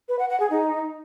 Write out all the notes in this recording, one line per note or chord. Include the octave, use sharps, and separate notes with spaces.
B4
F#5
F#5
G#4
D#4